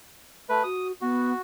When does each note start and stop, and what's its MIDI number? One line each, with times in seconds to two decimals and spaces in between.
0.49 0.63 57
0.49 0.63 71
0.64 0.92 66
0.64 0.88 87
1.01 1.33 59
1.01 1.42 66